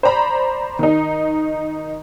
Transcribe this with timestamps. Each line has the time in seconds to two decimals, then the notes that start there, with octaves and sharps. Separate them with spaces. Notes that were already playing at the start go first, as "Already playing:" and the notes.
0.03 C5 D5 A#5 B5
0.79 D#3 D#4